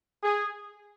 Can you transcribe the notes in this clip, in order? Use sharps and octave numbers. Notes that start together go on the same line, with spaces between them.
G#4